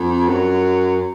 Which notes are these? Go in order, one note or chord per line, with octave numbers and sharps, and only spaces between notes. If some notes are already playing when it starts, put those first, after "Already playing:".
Already playing: F2
F#2